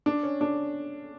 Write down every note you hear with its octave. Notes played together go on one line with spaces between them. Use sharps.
D4
C#4
D4